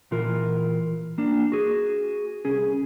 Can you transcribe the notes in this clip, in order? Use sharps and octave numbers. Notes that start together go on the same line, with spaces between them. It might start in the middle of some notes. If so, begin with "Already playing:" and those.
A#2 E3 F4 A#4
A#3 D4
F#4 G#4
C2 C#4 G#4